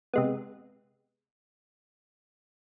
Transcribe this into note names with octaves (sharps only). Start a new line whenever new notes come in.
C3 G#3 B3